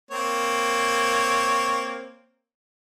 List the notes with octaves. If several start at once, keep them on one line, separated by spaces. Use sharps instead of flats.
A#3 C4 C#5